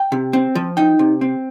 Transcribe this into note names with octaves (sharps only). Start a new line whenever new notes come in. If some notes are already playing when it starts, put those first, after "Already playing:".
Already playing: G5
C3
C4
F3
D#4 G5
C3
C4